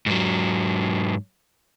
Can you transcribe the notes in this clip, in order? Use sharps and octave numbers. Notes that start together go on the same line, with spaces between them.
G#2 F#3